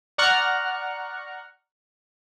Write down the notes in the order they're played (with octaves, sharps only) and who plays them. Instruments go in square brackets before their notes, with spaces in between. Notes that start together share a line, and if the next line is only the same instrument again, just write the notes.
[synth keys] D5 F#5 A#5 C#6 F6 F#6